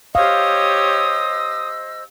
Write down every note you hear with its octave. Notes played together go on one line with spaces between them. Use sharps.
G4 C5 C#5 D#5 F5 D#6 E6